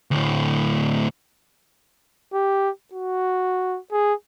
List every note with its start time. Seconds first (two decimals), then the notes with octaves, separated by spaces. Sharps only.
0.11 D2 A2
2.33 G4
2.93 F#4
3.92 G#4